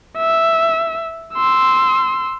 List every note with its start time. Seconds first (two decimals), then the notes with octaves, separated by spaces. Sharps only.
0.18 E5
1.35 C6 E6